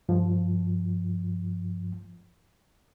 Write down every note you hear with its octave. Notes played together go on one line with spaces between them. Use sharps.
G2 F3